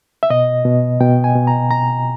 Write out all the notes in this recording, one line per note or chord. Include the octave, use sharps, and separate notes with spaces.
E5
B2 D#5
B2
B2 G5
G#5
B2
A#5
B2 A#5